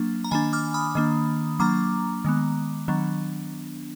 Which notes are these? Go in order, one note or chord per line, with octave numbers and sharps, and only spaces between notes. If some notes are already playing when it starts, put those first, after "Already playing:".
Already playing: F#3 A#3 D4
A#5
D#3 A#3 D4 G#5 B5
D6 F6
B5 D#6
D#3 A#3 D4
F#3 A#3 D4 A#5 D6
D#3 G#3 B3
D#3 F#3 B3 D4